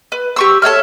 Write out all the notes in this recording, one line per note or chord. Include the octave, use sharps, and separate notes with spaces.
B4
G4 C#6 E6
A4 C#5 E5 F6